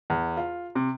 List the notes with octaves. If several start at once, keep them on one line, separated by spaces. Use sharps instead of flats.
E2
F4
C3